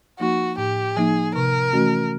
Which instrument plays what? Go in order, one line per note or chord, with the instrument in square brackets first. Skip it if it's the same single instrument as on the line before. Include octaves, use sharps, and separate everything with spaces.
[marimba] F3 A#3 D#4 [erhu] F#4
[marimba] A2 [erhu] G4
[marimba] F3 A#3 D#4 [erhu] G#4
[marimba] C3 [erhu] A#4
[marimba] E3 A3 C#4 F#4